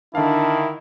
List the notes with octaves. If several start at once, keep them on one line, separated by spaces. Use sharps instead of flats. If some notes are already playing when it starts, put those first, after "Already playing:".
D3 D#3 D4 E4 F5